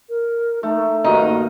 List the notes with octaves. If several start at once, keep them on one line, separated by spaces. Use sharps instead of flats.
A#4
A3 D#4
G2 A#2 D#3 D#4 F#4